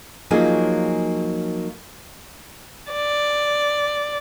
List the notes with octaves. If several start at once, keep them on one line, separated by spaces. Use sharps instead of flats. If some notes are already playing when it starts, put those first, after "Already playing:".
F3 F#3 A#3 C#4 D#4 G#4
D5